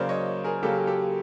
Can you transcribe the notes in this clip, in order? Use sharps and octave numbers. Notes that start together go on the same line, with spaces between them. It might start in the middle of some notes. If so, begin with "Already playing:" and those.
Already playing: C#3 F#3 A#3 C5 D5
C#5 D#5
G#4 A#4
C#3 F#3 A#3 G4 A4
G4 A4